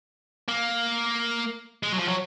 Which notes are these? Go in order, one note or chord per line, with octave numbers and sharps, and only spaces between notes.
A#3
G#3
F#3
F3
F#3